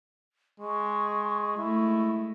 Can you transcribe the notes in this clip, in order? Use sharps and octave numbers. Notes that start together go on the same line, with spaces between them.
G#3 C#6
G#3 A3 E4